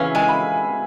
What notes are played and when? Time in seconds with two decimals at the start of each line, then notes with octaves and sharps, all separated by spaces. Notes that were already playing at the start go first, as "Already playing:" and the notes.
Already playing: C#3 E3 C#4 E5 F5
0.15 G#3 G#5
0.29 B5